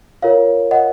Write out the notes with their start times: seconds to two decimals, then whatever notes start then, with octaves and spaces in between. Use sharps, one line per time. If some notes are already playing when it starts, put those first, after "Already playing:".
0.22 F4 A#4 C#5 F5
0.71 D#5 F#5